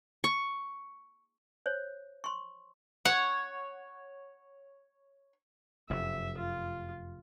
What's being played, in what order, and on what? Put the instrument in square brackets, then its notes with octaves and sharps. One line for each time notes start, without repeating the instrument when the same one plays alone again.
[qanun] C#6
[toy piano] C5 C#5
C6 C#6
[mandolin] C#5 [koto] F#5
[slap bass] F1 F#2 [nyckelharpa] E5
[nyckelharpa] F4